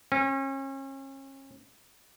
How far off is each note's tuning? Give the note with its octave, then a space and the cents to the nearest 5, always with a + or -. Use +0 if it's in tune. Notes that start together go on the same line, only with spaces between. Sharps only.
C#4 -35